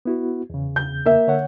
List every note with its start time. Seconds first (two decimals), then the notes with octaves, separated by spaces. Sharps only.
0.05 B3 E4 F#4
0.50 E2 C#3
0.76 G6
1.06 A#3 E5
1.27 D3 C#5 F#5